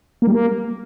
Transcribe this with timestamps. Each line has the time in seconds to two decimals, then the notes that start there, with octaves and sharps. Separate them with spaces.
0.22 A#3
0.27 G3
0.32 A#3